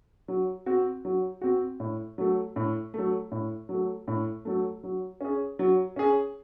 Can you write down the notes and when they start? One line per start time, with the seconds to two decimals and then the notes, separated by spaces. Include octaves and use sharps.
0.28 F#3
0.66 C4 F#4
1.05 F#3
1.41 C4 F#4
1.80 A2
2.18 F#3 A3
2.56 A2
2.94 F#3 A3
3.32 A2
3.69 F#3 A3
4.08 A2
4.45 F#3 A3
4.83 F#3
5.21 C#4 G#4
5.59 F#3
5.96 C#4 G#4